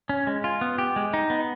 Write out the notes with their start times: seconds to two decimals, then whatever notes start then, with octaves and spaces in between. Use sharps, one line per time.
0.09 C#4
0.27 G#3
0.44 F4
0.61 B3
0.78 G4
0.96 G#3
1.13 D#4
1.30 B3